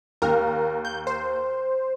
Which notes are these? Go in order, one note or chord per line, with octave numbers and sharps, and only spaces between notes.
D#2 A#4
G6
C5